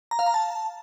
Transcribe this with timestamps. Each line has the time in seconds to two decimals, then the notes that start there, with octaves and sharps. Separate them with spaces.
0.11 A#5
0.19 F5
0.26 A#5
0.34 A5